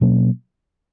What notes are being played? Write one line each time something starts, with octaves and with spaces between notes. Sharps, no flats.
B2 F#3 A#3 C#4